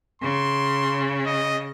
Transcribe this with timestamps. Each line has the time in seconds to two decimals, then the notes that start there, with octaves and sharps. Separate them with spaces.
0.22 C#3 C6
1.26 D#5